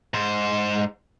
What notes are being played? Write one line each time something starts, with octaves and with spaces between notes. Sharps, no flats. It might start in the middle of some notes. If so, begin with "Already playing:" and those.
G#2 C5